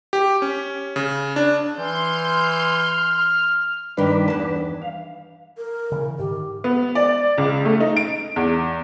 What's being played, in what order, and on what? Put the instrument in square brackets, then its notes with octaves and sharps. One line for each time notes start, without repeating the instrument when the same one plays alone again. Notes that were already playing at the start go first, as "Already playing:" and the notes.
[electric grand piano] G4
C#4
C#3
D4
[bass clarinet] E3 [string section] C6 G6 [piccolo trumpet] F6
[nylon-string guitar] G2 D#3 [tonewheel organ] D4 B4
[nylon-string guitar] E2 A5
[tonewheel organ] F5
[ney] A#4
[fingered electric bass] C#3 E3
[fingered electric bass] G#2 D#3 [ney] G4
[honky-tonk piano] B3
D5
C#2
A3
D#4
D7
E2